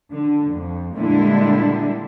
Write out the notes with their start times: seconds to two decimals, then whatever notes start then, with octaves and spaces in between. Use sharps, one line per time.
0.11 D3
0.52 F2
0.96 A#2 D3 G3 G#3 E4